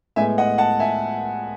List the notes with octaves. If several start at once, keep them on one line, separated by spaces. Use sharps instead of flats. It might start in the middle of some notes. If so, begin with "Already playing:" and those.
A2 G#3 B3 E5 G#5
D#5 F#5
F#5 A5
E5 G#5